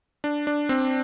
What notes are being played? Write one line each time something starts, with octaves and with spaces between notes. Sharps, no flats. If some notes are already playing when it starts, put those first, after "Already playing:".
D4
D4
C4